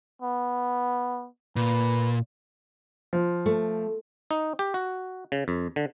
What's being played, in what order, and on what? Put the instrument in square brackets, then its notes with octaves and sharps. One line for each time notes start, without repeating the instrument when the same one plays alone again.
[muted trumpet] B3
[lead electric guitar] A#2 [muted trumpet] B4
[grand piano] F3
[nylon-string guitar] A3
[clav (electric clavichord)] D#4
G4
F#4
C#3
F2
D3